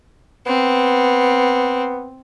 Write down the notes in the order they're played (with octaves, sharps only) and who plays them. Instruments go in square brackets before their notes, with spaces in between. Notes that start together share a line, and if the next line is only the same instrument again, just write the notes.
[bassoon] B3 [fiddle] C4